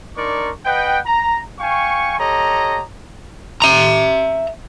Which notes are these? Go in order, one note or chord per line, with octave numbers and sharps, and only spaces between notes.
D4 D#4 A#4 D5 C6 C#6
B4 D#5 F#5 G5
A#5
F5 G5 G#5 C#6
G4 A4 C#5 D#5 A#5
E5 A#5